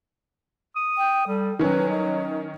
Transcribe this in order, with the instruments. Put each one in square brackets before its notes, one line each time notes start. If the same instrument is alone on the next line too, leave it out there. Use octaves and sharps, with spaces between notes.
[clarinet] D#6
[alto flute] G5
[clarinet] G3 [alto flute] A4
[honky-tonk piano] D#3 C#4 [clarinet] F#3 [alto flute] B4
[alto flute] D#4